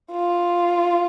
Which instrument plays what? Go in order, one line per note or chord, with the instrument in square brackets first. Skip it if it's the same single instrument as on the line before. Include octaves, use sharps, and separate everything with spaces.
[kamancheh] F4